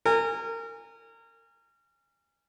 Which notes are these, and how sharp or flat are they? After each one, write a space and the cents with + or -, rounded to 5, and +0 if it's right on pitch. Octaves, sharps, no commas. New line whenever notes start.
A#4 -30 G#5 -25